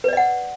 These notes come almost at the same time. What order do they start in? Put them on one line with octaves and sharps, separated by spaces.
B4 D5 D#5 F#5